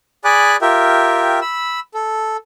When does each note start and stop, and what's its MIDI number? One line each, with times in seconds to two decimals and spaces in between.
0.24 0.56 68
0.24 0.56 74
0.24 0.56 80
0.24 0.56 83
0.24 0.56 86
0.24 0.56 90
0.62 1.40 65
0.62 1.40 67
0.62 1.40 70
0.62 1.40 76
0.62 1.40 79
1.42 1.80 83
1.42 1.80 88
1.94 2.37 69